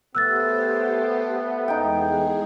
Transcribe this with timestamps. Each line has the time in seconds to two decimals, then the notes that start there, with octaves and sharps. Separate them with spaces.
0.15 A3 B3 G4 C5 E6 F#6 A6
1.68 E2 G#3 D#4 G#4 G5